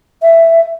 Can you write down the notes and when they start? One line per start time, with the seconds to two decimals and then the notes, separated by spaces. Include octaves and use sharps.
0.22 E5